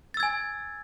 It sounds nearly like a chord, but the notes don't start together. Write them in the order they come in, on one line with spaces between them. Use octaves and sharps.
A6 E6 G#6 G#5